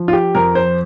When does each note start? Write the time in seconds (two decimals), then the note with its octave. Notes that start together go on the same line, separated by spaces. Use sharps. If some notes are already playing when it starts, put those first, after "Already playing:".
Already playing: F3
0.08 F4
0.13 G4
0.35 F2 A#4
0.55 C5